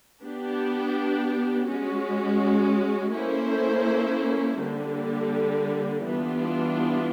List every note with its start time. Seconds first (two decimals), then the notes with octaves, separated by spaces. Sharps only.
0.22 B3 D4 G4
1.68 G#3 C#4 F#4
3.15 A#3 C#4 E4 A4 C5
4.61 D3 G3 A#3
6.07 E3 G3 B3 D4 F4